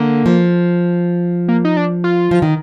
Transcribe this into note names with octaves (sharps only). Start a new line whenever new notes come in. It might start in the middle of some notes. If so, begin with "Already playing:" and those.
Already playing: D3 A#3
F3
A#3
D#4
D4
F4
F3
D#3